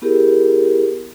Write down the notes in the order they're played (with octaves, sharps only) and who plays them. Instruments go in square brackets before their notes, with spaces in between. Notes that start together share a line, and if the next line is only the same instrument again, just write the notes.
[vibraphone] B3 E4 G4 G#4 A#4